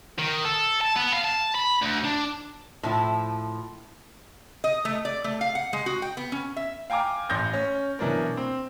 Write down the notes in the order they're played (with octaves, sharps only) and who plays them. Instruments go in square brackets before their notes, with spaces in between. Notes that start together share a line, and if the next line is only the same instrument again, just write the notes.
[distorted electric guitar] D#3
A4
A5
B3
F5
A5
B5
D2
D4
[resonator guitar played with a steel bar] A2 F3 E4
D#5
A3
D5
A3
F5
F#5
G#3
F#4
G5
B3
C#4
E5
[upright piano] F5 G5 G#5 A#5 D6 F6
A1 C6 G6 A#6
C#4
B2 E3 F#3 D4 A#4
C4